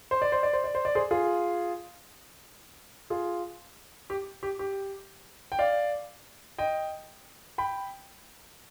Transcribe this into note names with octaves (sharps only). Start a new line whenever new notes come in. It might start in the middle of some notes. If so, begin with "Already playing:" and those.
C5
D5
C5
D5
C5
D5
C5
D5
G#4 C5
F4 G#4
F4 G#4
G4
G4
G4
G5
D5 F5
D#5 G5
G5 B5